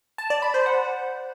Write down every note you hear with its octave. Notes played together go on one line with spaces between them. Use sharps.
A5
D5
B5
C5
F#5